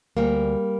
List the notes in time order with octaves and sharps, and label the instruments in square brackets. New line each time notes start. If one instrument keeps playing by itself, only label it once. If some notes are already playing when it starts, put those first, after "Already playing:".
[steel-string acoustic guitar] D2 G3 A#3